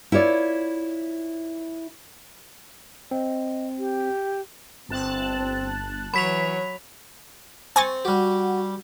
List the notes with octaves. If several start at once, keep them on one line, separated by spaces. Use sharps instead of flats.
E4 F4 C#5 D5
C4 D#5
G4
G1 C4 A5 F#6
E3 F#3 C#5 B5 B6 F7
C4 G#5 C#6 A6
G3 F#4 G4